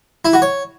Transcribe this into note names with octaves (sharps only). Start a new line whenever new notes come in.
E4
F#4
C#5